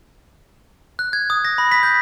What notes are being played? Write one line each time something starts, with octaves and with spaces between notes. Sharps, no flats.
F#6
G#6
D#6
A#6
B5
B6
G6